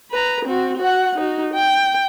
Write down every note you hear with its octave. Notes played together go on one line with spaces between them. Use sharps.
B4 A#5
C4 F#4
F#4 F#5
D#4 F#4
G5